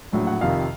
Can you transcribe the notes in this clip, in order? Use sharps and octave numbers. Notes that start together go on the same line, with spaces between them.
A#1 A2 F#3
F#5
F2 C3 D#3 F5